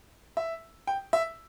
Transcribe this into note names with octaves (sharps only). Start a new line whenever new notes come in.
E5
G5
E5